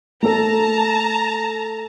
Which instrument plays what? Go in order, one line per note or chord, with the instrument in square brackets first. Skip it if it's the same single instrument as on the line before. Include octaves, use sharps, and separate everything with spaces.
[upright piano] A3 A4 [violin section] A5 A#5